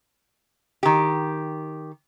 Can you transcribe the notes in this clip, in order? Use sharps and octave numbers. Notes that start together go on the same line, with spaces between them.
D#3 G4